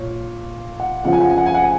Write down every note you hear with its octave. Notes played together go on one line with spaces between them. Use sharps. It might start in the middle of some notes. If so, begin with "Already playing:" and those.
Already playing: A#2 C#5
F#5
F2 C#3 F3 F#5
G#5
F#5
G#5
F#5
G#5
F#5
G#5